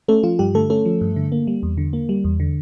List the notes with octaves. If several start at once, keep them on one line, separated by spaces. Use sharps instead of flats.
A3 C#4 A4
F3 F4
G2 G3 G4
D3 A3 A4
A3 C#4 A4
F3
G2
D3
A#3
G3
E2
D3
A#3
G3
E2
D3